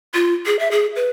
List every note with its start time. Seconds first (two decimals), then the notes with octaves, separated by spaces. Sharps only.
0.14 F4
0.46 G#4
0.59 E5
0.71 G#4
0.96 B4